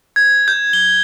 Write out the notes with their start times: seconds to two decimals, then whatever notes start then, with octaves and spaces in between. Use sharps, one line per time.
0.16 G#6
0.48 G6
0.73 G7